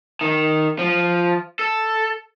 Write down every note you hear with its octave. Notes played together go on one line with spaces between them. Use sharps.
D#3
F3
A4